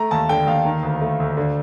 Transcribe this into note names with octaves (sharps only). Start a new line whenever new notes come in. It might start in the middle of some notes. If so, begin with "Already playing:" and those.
Already playing: A3 A#5
D#2 A5
D3 G5
D#2 F5
D#3
D2
A3
D2
D3